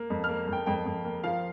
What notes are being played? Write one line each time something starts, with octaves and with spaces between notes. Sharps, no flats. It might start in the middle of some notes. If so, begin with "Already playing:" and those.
Already playing: A#3
F2
A#3 F6
F2
G5
F2 G5
F2
A#3
F3 F5